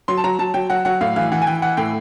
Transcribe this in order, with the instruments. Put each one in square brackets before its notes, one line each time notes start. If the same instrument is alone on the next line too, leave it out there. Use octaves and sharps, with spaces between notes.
[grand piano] F#3 C6
A5
F#3 A#5
F#3 A5
F#3 G5
F#3 F#5
F#3 F#5
A2 F5
E3 F5
E3 F#5
G#5
E3 G5
E3 F#5
A2 G5